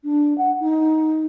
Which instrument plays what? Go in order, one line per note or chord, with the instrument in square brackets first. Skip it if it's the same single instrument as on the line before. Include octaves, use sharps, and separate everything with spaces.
[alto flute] D4
F#5
D#4